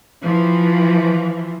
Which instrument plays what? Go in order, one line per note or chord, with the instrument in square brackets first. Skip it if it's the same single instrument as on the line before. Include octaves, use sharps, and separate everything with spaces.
[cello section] E3 F3